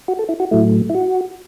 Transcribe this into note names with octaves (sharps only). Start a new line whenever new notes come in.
F#4
A4
E4
F#4
A2 F#3 A3 E4
E4
F#4